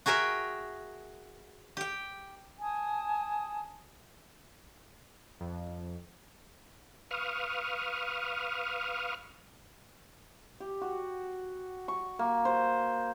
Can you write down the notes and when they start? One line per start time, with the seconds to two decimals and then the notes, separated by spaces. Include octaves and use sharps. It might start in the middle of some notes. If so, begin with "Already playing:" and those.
0.06 F#4 G#4 A#4 E5 G5
1.77 G4 G5
2.61 G#5 A5 D#6
5.41 F2
7.11 B4 F5 C#6 D#6 F6
10.60 G4
10.82 F#4
11.88 C#6
12.19 A#3
12.45 C5